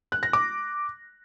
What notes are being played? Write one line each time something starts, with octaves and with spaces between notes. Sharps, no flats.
F#6
A#6
D6